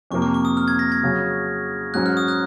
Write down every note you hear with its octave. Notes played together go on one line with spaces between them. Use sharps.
F2 C3 F3 A#3 C#6
C#6
C#6
D#6
F6
G#6
A#6
G#6
C#3 F#3 C#4
G#2 F#3 C#4 F#6
F6
D#6
F#6